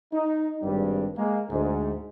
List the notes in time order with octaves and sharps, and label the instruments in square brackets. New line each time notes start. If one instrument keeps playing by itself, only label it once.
[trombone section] D#4
G#1 G2 G3
G#3 A#3
D2 G#2